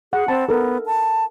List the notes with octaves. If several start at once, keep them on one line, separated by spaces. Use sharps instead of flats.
G#4 F#5
C4 A5 B5
B3 A4 A#4
A5